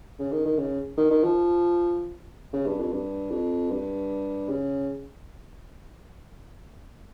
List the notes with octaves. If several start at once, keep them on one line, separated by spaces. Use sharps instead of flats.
C#3
D#3
D#3
C#3
D#3
D#3
F3
C#3
G2
F2
G2
F2
G2
C#3